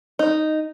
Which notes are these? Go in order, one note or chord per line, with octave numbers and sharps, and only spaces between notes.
D#4